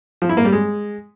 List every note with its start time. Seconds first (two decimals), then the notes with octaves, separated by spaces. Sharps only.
0.22 F3
0.29 E4
0.37 A#3
0.45 G3
0.52 G#3